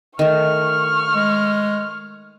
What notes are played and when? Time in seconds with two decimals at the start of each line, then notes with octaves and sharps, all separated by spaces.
0.19 D#3 A3 C#6 F6
1.15 G#3